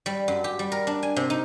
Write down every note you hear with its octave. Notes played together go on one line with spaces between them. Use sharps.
G3
F#2
G4
G3
A#4
D4
G#5
C3
D#4